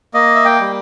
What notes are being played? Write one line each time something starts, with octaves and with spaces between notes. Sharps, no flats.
A#3 D#5
E5
G5
G3